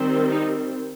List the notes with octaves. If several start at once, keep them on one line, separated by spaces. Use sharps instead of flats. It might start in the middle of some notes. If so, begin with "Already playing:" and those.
Already playing: D#3 G3 C4
D#4